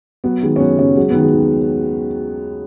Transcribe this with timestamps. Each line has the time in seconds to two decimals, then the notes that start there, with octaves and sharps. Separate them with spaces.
0.24 F#3 B3
0.43 D#3 G#3
0.56 C#4
0.60 F#2 B3
0.78 F#2 C#3 C#4
0.96 F#3 G#3
1.10 D#3 B3
1.23 G#3
1.33 D#2